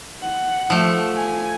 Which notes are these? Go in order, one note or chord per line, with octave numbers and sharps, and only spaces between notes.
F#5
F3 A3
G#5